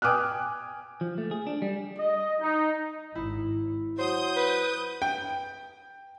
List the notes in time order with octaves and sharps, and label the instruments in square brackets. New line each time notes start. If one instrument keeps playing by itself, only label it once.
[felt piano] G5 G#5 D6 D#6 F6 F#6
[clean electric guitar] F3
A3
G#4
D4
G3
[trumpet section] D#5
D#4
[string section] G#1 [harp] E4
[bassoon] F#3 [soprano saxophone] C5 [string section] D#6 G6
[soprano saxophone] B4
[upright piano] G5